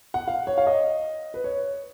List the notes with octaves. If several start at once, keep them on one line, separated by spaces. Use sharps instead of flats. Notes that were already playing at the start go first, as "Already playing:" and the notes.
F#5
F5
C#5
F5
D#5
B4
C#5